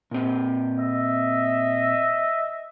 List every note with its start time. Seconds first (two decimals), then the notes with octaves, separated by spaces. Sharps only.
0.11 A#2 C4
0.79 D#5 E5